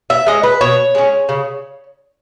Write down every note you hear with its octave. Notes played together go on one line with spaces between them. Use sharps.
E5
G#3 C#4 D#5
B4
B2 C#5
G#3 C#4
C#3